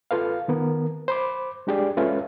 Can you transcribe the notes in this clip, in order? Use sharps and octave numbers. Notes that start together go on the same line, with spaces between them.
F4 A4 B4 F5
D#3 B3 A#4
C5 B5 D6
G#3 D4 G4 G#4 D5
G#3 C#4 F4 A4 B4 E5